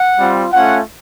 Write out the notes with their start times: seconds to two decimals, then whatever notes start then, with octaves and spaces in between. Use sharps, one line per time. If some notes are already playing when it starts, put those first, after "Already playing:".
Already playing: F#5
0.19 G3 C4 F4
0.53 A3 C#4 F4 F#5